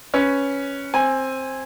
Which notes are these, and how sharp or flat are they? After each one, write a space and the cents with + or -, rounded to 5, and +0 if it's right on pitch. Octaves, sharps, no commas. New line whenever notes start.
C#4 +0 B4 +0
C4 +10 G#5 -10